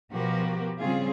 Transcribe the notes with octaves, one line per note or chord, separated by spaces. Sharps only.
B2 F3 B3 F#4 G4 A#4
C#3 G3 C4 C#4 F4 G#4